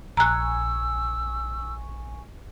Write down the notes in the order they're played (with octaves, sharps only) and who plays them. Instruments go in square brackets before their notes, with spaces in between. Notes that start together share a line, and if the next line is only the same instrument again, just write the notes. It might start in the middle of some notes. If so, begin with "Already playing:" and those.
[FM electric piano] A#1 G#5 C#6 [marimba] A#5 F#6 [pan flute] E6